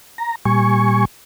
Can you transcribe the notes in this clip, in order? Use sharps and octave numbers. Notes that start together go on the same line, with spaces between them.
A#5
A#2 G3 G#5 C#6